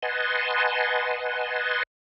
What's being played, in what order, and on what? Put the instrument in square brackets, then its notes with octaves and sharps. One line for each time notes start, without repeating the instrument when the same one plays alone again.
[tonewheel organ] B4 D#5 F#5 G#5 A5 C6